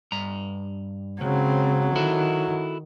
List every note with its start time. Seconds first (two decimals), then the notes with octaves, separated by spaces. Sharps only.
0.12 G2 A#5
1.21 C#2 C#3 F#3 C4
1.96 D#3 E4 F#4 A4